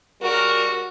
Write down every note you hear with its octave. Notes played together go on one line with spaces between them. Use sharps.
C#3 G3 F#4 A#4